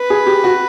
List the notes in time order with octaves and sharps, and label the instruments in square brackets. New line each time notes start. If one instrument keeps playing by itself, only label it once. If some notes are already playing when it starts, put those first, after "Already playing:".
Already playing: [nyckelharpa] B4
[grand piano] G#4
G4
F#4